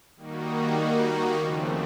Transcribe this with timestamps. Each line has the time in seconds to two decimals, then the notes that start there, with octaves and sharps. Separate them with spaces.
0.16 D#3 G3 A#3 D#4 F#4
1.35 D#2 C#3 F3 A3 C4